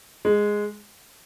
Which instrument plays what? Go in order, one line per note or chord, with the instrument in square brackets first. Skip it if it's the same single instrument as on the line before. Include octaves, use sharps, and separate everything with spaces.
[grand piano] G#3